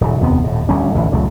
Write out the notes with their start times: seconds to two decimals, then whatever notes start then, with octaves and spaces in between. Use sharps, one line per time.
0.01 D#1 F#2 C#3
0.21 F1 D#2 B3 C4
0.44 D#1 A2
0.69 D1 D2 G3 C#4
0.94 A1 D2 G2 E3
1.11 D#1 C#2 F#2 A3